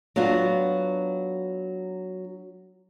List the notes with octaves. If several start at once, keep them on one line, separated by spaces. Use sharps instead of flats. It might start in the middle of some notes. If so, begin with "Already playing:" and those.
F#3 B3 D4 F4 F#4